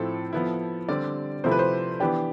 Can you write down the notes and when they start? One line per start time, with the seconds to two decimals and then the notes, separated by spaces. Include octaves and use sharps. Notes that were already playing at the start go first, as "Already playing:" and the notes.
Already playing: A2 F3 C4 E4 A4
0.33 F3 B3 E4
0.89 D3 G3 C4 D5
1.44 C3 F3 A3 E4 C5
1.51 B4
1.59 C5
2.00 E3 B3 D4 G4